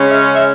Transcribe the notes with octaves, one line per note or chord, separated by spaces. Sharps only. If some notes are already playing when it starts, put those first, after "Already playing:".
Already playing: C#3 G#3 C#4
E5
E5